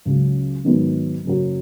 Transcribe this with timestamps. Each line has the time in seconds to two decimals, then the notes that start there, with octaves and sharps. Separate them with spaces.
0.05 C#2 C#3 F#3
0.65 G#2 D#3 F#3 B3
1.25 F#1 F#2 F#3